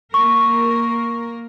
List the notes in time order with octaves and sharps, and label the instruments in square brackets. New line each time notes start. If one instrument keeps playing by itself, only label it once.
[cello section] A#3 A#4 [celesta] C#6